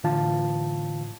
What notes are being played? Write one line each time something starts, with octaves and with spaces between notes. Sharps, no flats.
A2 D3 E3 F4 F5 A5